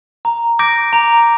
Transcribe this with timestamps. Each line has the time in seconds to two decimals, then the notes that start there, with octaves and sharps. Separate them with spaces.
0.25 A#5
0.59 D6 G6 A#6 D7
0.93 A#5